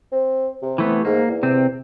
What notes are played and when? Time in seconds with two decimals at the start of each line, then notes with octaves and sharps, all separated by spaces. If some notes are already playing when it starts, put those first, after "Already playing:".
0.12 C4
0.62 C3
0.78 E3 A3 B3
1.05 G#2 A#3
1.28 E2
1.43 C3 C4